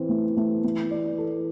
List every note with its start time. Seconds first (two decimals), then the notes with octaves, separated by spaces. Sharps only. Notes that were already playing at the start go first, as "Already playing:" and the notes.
Already playing: E3 C4
0.09 A3
0.37 A3
0.64 A3
0.91 D5
1.18 A4